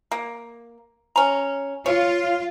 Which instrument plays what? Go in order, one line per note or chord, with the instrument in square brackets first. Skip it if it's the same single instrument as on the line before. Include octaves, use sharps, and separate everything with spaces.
[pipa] A#3
C#4 A#5
[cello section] F4 [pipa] C#5